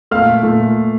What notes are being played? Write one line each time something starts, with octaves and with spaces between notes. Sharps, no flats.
A#2 A3 F5 F6
A#2 A3